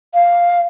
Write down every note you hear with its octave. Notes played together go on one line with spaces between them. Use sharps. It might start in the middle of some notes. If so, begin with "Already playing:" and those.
F5